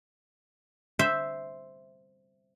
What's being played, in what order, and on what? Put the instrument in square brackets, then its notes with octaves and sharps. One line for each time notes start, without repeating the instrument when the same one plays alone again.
[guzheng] C5 E5